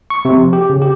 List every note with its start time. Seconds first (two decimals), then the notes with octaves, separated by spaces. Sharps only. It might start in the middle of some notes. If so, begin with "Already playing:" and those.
0.10 C#6
0.25 C3
0.37 F3
0.53 G4
0.70 C#3
0.82 G4